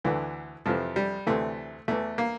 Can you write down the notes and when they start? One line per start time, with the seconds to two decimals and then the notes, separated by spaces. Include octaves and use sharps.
0.04 D2 D3 E3
0.66 F2 C3 E3 F3
0.96 G3
1.27 D2 C3 E3 A3
1.88 E2 E3 A3
2.18 A#3